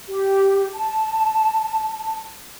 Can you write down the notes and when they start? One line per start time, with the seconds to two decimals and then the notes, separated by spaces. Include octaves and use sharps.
0.09 G4
0.74 A5